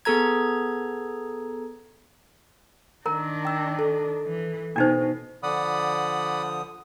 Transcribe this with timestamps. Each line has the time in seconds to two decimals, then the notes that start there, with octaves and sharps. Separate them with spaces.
0.05 B3 G#4 A4 A#5 G#6
3.06 D#3 D4 A#4 A#5
3.45 G5 E6
3.79 A4
4.26 E3
4.76 B2 D4 D#4 C5
5.43 D3 F3 D5 F#5 B5 D#6